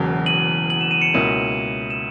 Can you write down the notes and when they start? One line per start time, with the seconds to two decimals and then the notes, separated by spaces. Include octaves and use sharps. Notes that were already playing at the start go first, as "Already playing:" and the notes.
Already playing: E1 E2 C#3 F#3 A#3
0.26 D#7 F#7
0.70 F#7
0.81 E7
0.91 D#7
1.02 C#7 E7
1.14 C#2 B2 A#3 C#4 E4
1.90 E7